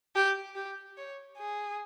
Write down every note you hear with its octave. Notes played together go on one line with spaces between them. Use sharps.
G4
G4
C#5
G#4